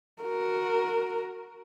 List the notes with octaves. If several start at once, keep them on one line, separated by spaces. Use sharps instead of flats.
F#4 A#4